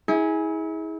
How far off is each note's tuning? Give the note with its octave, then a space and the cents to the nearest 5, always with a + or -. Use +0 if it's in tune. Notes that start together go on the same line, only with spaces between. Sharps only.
E4 -40 G#4 +0